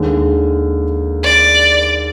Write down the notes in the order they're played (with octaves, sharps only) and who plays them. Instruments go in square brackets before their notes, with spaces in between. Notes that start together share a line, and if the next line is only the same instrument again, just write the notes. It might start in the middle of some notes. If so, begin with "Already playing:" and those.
Already playing: [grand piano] D#2 D3 G#3
[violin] D5